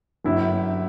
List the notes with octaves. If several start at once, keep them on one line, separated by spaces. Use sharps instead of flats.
G1 F#2 F#3 E4